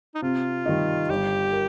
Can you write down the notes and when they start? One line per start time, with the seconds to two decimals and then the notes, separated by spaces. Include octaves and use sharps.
0.15 D#4
0.22 C3 F4
0.66 D#3 G3 D#4
1.10 G1 G4
1.53 A#4